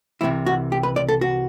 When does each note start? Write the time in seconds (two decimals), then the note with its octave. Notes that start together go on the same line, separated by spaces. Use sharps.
0.21 C2 C3 E3 E4
0.46 F#4
0.72 G4
0.83 B4
0.96 D5
1.08 A4
1.21 F#4